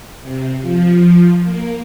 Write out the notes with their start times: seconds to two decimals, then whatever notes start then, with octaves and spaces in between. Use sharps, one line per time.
0.21 C3
0.60 F3
1.44 A#3